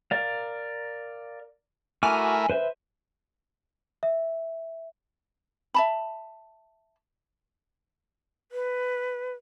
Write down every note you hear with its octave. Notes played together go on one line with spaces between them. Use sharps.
A#4 D5 F5
A3 E4 F#4 A#4 G#5 D6 F6
B4 C5 E5
E5
E5 A5 B5
B4